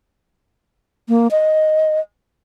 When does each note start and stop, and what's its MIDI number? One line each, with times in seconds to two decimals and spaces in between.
1.09 1.28 58
1.31 2.00 75